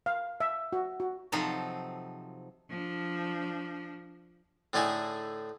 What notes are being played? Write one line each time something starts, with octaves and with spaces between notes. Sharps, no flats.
F5
E5
F#4
F#4
C3 F3 F#3 C4 D#4 A4
F3 D4
A2 D3 A3 D#4 E4 G#4